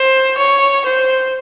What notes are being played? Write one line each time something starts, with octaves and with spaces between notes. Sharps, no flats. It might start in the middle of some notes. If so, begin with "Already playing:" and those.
Already playing: C5
C#5
C5